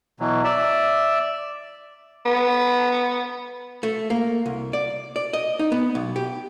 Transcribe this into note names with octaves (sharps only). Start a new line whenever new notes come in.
B2 E3 F#3
D5 E5
B3
A3
A#3
C2
D5
D5
D#5
D#4
B3
B1
G4